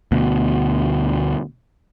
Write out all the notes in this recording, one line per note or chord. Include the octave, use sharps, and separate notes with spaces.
D2 B2